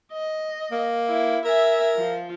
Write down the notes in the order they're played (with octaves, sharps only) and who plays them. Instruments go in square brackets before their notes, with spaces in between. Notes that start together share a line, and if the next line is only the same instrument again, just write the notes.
[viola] D#5
[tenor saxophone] A#3
[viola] E4
[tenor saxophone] A#4 [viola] E5 G#5
[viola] F3 F4